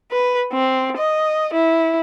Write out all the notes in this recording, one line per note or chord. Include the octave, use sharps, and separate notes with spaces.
B4
C4
D#5
E4